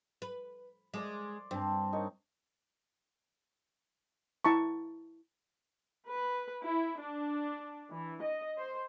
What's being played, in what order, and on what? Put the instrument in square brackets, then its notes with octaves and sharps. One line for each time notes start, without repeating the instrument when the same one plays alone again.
[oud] B4
[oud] G#3 [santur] D5 C6 D6
[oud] G2 [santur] C4 C5 A5
[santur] D#4 A#4 C#5
[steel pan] E4 A5 A#5 C#6
[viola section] B4
E4
D4
E3
D#5
C5